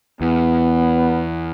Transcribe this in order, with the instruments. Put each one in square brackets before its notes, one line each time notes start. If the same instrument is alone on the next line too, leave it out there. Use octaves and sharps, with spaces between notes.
[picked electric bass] E2 [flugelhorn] B3